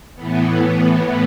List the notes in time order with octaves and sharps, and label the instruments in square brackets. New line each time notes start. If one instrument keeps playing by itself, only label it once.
[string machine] A2 E3 B3